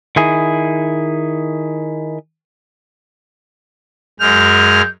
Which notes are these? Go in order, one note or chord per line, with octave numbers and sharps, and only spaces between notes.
D#3 E4 G#4
F#2 G#3 F6 G6